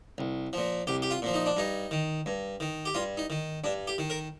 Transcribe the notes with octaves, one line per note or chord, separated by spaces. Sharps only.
C2
A#2 F3
C2 G4
G4
F4
A#2 F3
D#4
D4
G2 D#4
D#3
G2
D#3
G4
G2 F4
D#4
D#3
G2 D4
G4
D#3
A#4